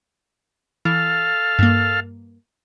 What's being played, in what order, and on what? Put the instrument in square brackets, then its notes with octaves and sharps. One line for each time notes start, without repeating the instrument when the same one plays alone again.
[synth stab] E3 [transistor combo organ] A4 F5 F6
[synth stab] G2 A#3